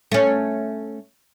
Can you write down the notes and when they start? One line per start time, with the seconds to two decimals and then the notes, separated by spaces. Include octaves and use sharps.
0.12 A3 C#4